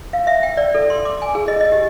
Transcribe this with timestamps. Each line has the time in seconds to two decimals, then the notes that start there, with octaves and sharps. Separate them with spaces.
0.13 F5
0.27 E5
0.43 G5
0.57 D5
0.75 A4
0.90 C6
1.05 D6
1.22 G#5
1.35 G#4
1.48 D#5
1.61 D#5
1.72 G4